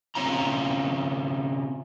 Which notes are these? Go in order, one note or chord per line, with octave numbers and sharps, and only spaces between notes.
C#3 C4 C#4 F4 A#5